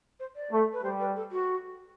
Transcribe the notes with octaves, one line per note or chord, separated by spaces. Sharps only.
C5
D5
A3
B4
G3 C5
B4
A4
F#4